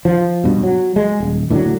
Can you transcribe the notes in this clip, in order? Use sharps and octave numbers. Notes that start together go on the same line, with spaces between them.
F3
G2 B2
F#3
G#3
D#1
A2 D3 D#3 F#3